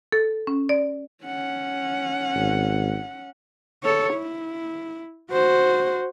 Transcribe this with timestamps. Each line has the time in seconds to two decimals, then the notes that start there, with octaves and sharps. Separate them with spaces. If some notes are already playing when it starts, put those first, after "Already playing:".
0.12 A4
0.47 C#4
0.69 D5
1.24 C#4 F#5
2.35 G#1
3.83 A4 C#5
4.14 E4
5.31 F#4 C5